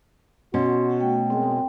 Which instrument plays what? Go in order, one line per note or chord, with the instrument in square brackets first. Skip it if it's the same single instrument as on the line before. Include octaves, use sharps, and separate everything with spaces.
[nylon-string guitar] B2 C#4 [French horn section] F#4 [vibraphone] C6
[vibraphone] A3 G5
[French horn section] F#2 G#3 [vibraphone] C4 G5